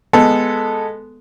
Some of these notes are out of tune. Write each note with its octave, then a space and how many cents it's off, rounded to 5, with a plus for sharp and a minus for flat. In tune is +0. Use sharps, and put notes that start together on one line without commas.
G#3 +0 B3 +0 A4 +0